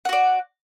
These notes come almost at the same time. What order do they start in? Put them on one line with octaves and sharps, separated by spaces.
F#5 F#4 D5